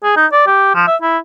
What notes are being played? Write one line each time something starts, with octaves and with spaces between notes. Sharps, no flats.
G#4
D#4
D5
G4
F3
E5
E4